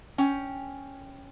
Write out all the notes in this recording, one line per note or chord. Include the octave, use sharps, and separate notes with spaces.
C#4 G5